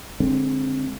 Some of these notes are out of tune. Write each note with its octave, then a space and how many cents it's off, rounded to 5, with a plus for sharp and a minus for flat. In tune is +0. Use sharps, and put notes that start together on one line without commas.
D3 +0 G#3 +0 C4 +15